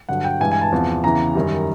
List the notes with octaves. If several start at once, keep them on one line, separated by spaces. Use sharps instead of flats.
G2 D3 F#3 F#5
G5
G2 E3 G#3 G#5
G#5
A5
E2 C3 F3
E2 C#3 E3 A#5
F#2 D#3 G3